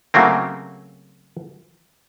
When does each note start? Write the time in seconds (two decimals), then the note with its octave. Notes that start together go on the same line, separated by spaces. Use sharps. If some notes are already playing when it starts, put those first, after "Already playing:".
0.14 C#3 F#3 A3 A#3 C4